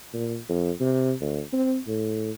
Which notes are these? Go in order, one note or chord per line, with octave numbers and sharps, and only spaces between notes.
A#2
F2
C3
D2
C4
A2